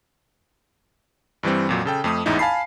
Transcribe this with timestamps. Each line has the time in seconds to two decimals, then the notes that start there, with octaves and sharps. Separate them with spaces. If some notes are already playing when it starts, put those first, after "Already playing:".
1.43 G2 E3 G3 C4
1.69 F2 A#2 F#3
1.85 C#3 A4 G5
2.04 F2 A3 D#6
2.26 A1 E2 G#2 D#4 E4
2.39 F5 G#5 A5 B5 C7